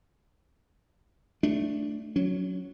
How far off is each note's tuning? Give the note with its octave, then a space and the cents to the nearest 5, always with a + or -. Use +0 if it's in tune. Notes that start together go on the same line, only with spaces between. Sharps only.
A3 +0 D4 +0
F#3 -5 C#4 +25